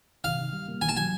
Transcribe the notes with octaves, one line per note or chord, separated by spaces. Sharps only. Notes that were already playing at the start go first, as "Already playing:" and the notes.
C3 F5
D#3
G3
A#3
B2 G#5
A5
F#3 G#5